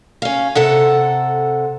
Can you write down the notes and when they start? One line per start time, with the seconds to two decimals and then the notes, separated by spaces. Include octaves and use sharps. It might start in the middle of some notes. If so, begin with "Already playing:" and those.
0.22 C#4 F5
0.55 C3 A4 F#5